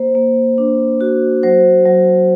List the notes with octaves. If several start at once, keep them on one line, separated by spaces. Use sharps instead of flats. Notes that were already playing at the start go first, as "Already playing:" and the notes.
Already playing: A#3 C5
A#3
D4
F#4
F#3 C5
F#3